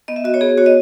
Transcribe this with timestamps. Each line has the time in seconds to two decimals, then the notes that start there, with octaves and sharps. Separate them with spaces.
0.08 B3 D#5
0.16 E5
0.24 F#4 D#5
0.34 C#5
0.41 B3 G#4
0.57 F#4 C#5
0.66 D#5